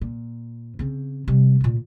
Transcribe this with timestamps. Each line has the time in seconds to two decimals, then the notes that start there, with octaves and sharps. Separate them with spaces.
0.01 A#2
0.79 C#3 C4
1.28 C3 G3
1.60 D2 A#2